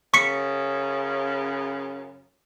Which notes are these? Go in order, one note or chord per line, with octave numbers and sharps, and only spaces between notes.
F#2 C#3 C#6 B6 C#7